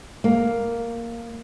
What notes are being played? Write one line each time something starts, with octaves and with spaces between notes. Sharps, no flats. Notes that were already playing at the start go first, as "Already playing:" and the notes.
A#3